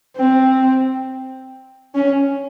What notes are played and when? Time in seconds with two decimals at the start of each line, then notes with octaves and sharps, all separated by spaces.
0.17 C4
1.95 C#4